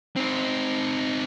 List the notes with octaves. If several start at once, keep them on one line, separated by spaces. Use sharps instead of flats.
C4 D#4